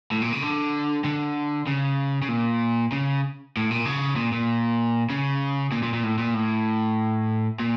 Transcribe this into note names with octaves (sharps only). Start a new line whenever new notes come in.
A2
A#2
C#3
D3
D3
C#3
C#3
A#2
C#3
A2
A#2
C#3
A#2
A#2
C#3
A#2
A#2
A#2
A2
A#2
A2
A#2